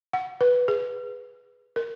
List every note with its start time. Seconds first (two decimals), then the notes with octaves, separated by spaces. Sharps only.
0.13 F#5
0.41 B4
0.68 G#4
1.76 A#4